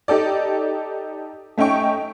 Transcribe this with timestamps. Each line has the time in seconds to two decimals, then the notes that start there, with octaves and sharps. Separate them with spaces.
0.08 D#4 G4 A4 D5
1.58 A3 C#4 D#4 G5 C#6